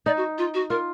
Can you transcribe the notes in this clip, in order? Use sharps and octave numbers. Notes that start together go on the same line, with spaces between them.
D#4 D5
F#4
F4
F#4
F4 A#4